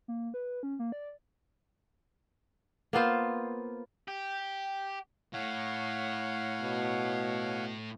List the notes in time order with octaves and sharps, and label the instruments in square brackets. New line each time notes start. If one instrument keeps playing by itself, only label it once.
[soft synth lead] A#3
B4
C#4
A#3
D5
[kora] A#3 B3 F4 C5
[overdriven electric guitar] G4
[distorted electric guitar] A2 [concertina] C#5 F5 F#5
[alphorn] B2